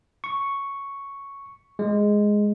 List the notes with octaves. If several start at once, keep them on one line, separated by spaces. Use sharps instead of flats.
C#6
G#3